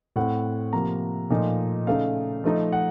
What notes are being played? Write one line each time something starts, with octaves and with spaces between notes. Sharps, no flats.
A2 A3 C4 F#5
C3 F3 A#3 A#5
A#2 F3 A3 D#4
C#3 A3 D#4 F5
F3 A3 D#4
F#5